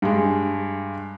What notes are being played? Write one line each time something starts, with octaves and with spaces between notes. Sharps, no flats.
G2 G#3